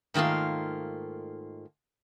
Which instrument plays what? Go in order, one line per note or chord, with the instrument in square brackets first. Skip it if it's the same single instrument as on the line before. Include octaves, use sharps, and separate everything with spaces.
[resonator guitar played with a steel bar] G#2 D#3 A3 A#3 F4